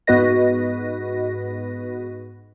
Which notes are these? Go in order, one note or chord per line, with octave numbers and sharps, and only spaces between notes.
G#2 B3 F#4 B4 D#5 A#6